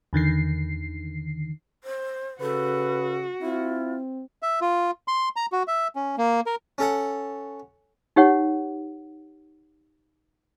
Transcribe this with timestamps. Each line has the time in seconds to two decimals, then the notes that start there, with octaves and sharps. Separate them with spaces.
0.13 E2 D3 D#3 C7
1.84 C5
2.41 C#3 F#4 A4 B4
3.42 C4 E4 F4
4.43 E5
4.61 F4
5.08 C6
5.36 A#5
5.52 F#4
5.68 E5
5.96 C#4
6.18 A#3
6.46 A#4
6.78 C#4 A4 F#5
8.16 D#4 G4 C#5 F#5